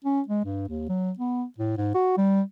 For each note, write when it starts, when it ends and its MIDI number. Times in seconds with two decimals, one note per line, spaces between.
0.05 0.21 61
0.28 0.43 56
0.45 0.66 43
0.69 0.86 39
0.89 1.11 54
1.19 1.45 59
1.58 1.73 45
1.77 1.94 44
1.94 2.17 66
2.18 2.42 55